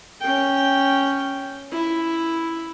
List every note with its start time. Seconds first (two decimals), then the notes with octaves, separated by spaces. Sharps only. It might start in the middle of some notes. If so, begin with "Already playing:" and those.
0.21 C#4 G5
1.72 E4